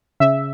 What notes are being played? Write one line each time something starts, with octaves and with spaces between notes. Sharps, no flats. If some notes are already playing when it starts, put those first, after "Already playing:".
C#3 E5